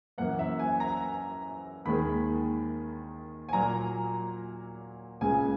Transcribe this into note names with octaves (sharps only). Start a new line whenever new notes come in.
F#2 E3 A#3 F#5
E5
G#5
A#5
D#2 D#3 G#3 B5
G#5
A#2 F#3 A#3 A#5
C#2 C#3 G#3 G#5